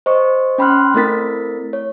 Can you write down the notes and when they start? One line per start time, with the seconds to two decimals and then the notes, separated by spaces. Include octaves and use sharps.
0.06 C5 D#5 C#6
0.58 C#4 G5 B5 C6 F6 F#6
0.94 A3 C4 E4 A#4 A6 B6
1.73 C#5